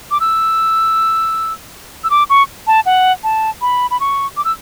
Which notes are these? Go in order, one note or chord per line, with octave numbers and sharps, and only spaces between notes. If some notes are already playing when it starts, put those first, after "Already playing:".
D6
E6
E6
D6
C#6
A5
F#5
A5
B5
B5
C#6
D6
E6